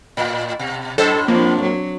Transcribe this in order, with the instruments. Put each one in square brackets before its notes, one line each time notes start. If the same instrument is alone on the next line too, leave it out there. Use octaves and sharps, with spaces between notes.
[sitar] A2
B2
[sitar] F#2 A2 C5 [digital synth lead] A4
[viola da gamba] F3 C4 D4 [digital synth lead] A#3
[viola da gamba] F#3